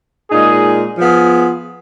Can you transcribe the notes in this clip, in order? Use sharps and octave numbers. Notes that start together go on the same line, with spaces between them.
A#2 G#3 D#4 G#4
F3 B3 F4 G#4